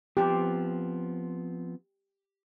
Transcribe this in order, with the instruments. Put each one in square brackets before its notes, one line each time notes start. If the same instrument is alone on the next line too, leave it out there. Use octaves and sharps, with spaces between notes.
[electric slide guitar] F3 B3 C4 [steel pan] G4